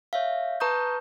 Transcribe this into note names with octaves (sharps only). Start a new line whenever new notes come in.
C#5 E5 F5
B4 A5 A#5 C#6 D#6 G6